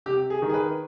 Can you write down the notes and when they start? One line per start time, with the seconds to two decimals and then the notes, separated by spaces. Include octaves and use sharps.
0.06 C3 G4
0.30 G#4
0.42 D#3
0.50 G#4
0.54 B4